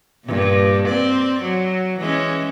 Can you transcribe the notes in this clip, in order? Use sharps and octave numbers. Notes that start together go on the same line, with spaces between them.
G2 A#2
C4 D5
F#3
E3 G#3 C#4